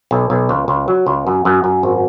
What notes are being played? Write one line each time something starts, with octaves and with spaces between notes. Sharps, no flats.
B1
B1
C#2
C#2
F#3
C#2
F#2
F#2
F#2
G#1